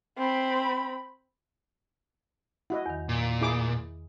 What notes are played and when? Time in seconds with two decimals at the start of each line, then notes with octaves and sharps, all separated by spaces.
0.18 C4 B5
2.70 E4 F#4 D#5 F#5
2.86 E2 D#3
3.09 A#2
3.41 E4 G#4 D6